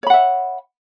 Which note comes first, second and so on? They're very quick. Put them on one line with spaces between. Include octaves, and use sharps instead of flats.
C#5 B5 F#5 E5